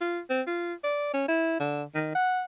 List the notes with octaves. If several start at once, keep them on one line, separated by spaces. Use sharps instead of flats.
F4
C4
F4
D5
C#4
E4
D3
D#3
F#5